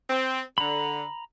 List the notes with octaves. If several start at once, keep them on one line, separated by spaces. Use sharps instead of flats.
C4
D3 A#5 B5